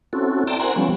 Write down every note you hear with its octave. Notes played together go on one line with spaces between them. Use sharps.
C4 C#4 E4 F#4 A4
D5 E5 G5 A5 A#5 C6
A#4 C5 F#5 G#5 A#5 C6
F3 G3 B3 C#4